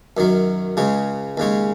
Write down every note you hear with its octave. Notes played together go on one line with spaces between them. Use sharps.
F#2 D#3 F#3
C#2 C#3 G#3 C#4
D#2 C#3 G#3 C#4